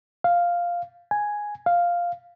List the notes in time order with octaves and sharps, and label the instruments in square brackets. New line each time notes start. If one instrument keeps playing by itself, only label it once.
[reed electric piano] F5
G#5
F5